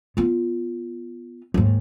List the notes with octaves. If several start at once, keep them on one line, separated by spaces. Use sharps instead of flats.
B3 F4
D#2 G#2